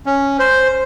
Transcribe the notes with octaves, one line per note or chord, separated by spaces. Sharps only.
C#4
C5